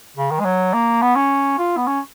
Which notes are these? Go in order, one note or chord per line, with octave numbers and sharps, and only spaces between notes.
C#3
D#3
G#3
F#3
A#3
B3
C#4
F4
B3
C#4